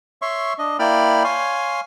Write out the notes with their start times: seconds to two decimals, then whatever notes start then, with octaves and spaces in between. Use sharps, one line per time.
0.22 C#5 E5 C6 C#6
0.58 D4 D#5
0.79 A#3 E4 D5 G5 B5 F6
1.24 C#5 F5 G#5 C6